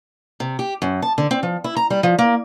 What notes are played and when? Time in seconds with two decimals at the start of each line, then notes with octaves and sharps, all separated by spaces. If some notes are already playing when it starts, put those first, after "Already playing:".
0.40 C3
0.59 G4
0.82 F#2
1.02 A5
1.18 D3
1.31 C4
1.43 F3
1.64 E4
1.76 A#5
1.90 G3
2.03 F3
2.19 A#3